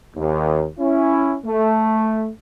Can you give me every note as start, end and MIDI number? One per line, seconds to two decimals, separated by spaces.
0.16 0.65 39
0.79 1.36 61
0.79 1.36 64
1.46 2.29 57